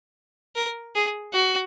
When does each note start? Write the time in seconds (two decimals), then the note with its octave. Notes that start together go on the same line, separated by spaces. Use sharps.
0.56 A#4
0.95 G#4
1.33 F#4